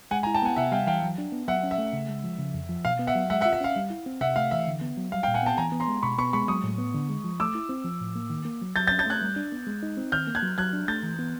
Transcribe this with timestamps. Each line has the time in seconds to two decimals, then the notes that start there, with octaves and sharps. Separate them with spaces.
0.11 G#3 F#5 G#5
0.23 G#5 A#5
0.27 E4
0.34 G5 A5
0.42 B3 F#5 G#5
0.56 C3 E5 F#5
0.72 G3 F5 G5
0.87 E3 F5 G5
1.03 F#3
1.18 D4
1.32 B3
1.47 F#3 E5 F#5
1.63 C#4
1.71 E5
1.78 A3
1.93 C#3
2.09 G#3
2.24 F3
2.38 C#3
2.54 F2
2.69 F3
2.85 B2 F5
2.99 B3
3.07 E5 F#5
3.15 F#3
3.30 G#3 E5 F#5
3.41 E5 F#5
3.46 F4
3.53 E5
3.61 C#4 F5
3.76 G3
3.90 E4
4.06 C4
4.21 C3 E5 F#5
4.36 A3 F5
4.51 E3 E5
4.67 D3
4.81 B3
4.97 F#3
5.12 G3 F5
5.23 F5 G5
5.28 A#2
5.34 F#5 G#5
5.43 B3 G5 A5
5.57 E3 G#5 A#5
5.72 B3
5.80 A#5 C6
5.88 G#3
6.03 B2 B5 C#6
6.18 B3 B5 C#6
6.33 G#3 B5 C#6
6.48 F#3 C#6 D#6
6.64 A2
6.78 B3
6.95 D3
7.09 G#3
7.24 F3
7.40 A3 D6 E6
7.55 E4
7.69 C4
7.84 F3
8.00 A2
8.15 A#3
8.30 D#3
8.45 A#3
8.61 F#3
8.76 F#3 G6 A6
8.87 G6 A6
8.91 C#4
8.99 G6 A6
9.06 A3 F#6 G#6
9.22 G3
9.36 D4
9.52 B3
9.67 G#3
9.83 D#4
9.97 C4
10.12 D#3 F6 G6
10.27 A#3
10.35 F#6 G#6
10.42 F#3
10.58 F#3 F#6 G#6
10.73 D4
10.88 A3 G6 A6
11.03 E3
11.19 B3